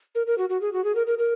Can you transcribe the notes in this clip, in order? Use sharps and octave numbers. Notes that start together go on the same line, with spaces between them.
A#4
A#4
F#4
F#4
G#4
F#4
G#4
A#4
A#4
A#4